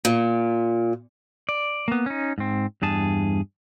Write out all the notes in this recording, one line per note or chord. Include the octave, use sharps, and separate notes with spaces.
A#2
D5
A#3 B3
C#4 D#4
G#2 C4
E2 G2 G#4 A5